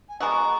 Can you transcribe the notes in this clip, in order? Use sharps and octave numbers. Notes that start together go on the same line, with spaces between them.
G#5
B2 G#3 B3 F#4 A#5